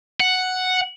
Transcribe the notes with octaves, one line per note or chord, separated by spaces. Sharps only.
F#5